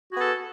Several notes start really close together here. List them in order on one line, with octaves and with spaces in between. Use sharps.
F#4 G#4 B3 A4